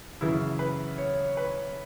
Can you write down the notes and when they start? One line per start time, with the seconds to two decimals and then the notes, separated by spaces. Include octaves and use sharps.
0.21 F#2 C#3 E3 E4
0.59 B4
0.98 C#5
1.37 B4